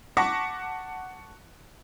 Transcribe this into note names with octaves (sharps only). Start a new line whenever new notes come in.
F#5 A5 C#6 D6 A#6 B6